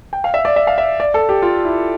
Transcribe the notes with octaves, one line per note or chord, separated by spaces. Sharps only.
G5
F5
E5
D5
E5
F5
E5
D5
A4
G4
F4
E4